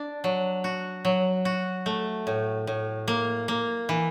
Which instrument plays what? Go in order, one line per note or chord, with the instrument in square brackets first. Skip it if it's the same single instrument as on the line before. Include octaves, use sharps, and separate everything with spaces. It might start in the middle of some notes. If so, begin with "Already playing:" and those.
Already playing: [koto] D4
F#3
F#4
F#3
F#4
A3
A2
A2
A#3
A#3
E3